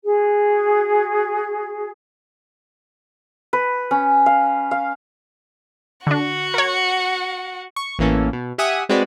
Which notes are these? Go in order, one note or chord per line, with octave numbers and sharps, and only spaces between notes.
F#4 G#4
B4
C#4
F5
F5
D3 D4 F#4 F#5
A#4 C#5
C#6
A1 E3 A#3 C#4 A4
B2
G4 E5 F#5 G#5 D#6
G#3 C4 F#4 B4 D5